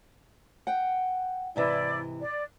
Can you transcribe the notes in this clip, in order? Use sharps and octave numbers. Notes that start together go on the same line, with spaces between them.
F#5 G5
G#2 C3 E3 E4 D5
D5